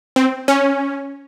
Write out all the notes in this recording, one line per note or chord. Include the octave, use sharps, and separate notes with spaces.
C4
C#4